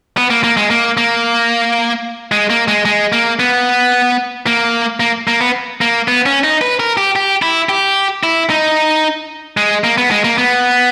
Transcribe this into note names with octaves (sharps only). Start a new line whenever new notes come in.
B3
A#3
A#3
G#3
A#3
A#3
G#3
A#3
G#3
G#3
A#3
B3
A#3
A#3
A#3
B3
A#3
B3
C#4
D#4
B4
A#4
G4
G4
E4
G4
E4
D#4
G#3
A#3
B3
G#3
A#3
B3